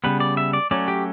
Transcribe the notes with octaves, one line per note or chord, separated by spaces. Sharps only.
C#3 G3 B3 B4
D5
E5
D5
F#3 A3 C#4 D5
G4